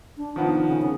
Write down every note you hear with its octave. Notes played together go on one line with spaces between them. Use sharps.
D4
D#3 F3 B3
C#3
G#4